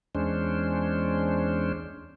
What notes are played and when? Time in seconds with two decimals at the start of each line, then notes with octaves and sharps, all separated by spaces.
0.15 E2 G#3 C#4 D4 C5